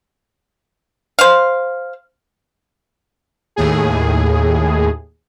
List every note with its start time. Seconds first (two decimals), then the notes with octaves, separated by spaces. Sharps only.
1.19 C5 F5
3.56 D#2 A2 G#4